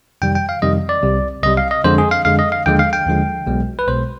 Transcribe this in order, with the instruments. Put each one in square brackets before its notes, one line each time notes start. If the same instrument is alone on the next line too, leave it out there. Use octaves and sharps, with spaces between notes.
[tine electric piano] F2 C3 D#3 G3 G5
G5
F5
F2 C3 D#3 G3 D#5
D5
C2 C3 G3
C2 C3 G3 D#5
F5
D#5
F2 D3 G#3 C5
G#4
F5
F2 D3 G#3 F5
D#5
F5
D#2 D3 F3 G#3 G5
F5
G5
D#2 D3 F3 G#3
B1 B2 G#3
B4
B1 B2 G#3 C5